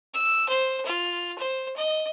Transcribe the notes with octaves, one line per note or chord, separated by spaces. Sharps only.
E6
C5
F4
C5
D#5